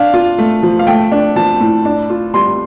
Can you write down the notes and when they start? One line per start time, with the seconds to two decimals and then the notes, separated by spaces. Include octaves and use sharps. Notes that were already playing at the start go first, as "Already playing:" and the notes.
Already playing: D4 F5
0.14 F4
0.38 A3
0.63 F3
0.79 F5
0.87 A3 G5
1.12 D4
1.36 F3 A5
1.60 A2
1.85 D4
2.10 F4
2.34 G3 C6